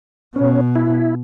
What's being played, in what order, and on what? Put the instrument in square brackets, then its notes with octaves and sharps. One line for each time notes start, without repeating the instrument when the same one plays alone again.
[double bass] B2 [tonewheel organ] C#4
[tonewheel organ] E4